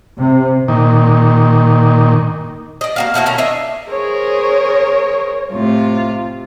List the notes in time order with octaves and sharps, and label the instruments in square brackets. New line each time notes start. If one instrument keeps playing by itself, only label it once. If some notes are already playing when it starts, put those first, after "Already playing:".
[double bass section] C3
[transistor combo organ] A#2 D#3
[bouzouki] D5 D#5
A#3 F#4 F5
B2 A3 A#3 F#4
D#3 C#4 A#4 A#5
D4 D#5 E5
[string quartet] G#4 A#4 C5 [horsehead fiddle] C#5
[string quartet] A2 C3 F4